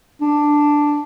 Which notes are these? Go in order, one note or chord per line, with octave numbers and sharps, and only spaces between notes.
D4